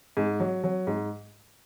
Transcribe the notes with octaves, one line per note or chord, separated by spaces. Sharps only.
G#2
F#3
F#3
G#2